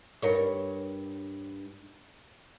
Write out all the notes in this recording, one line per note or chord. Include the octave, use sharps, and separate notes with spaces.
G2 A#4 C#5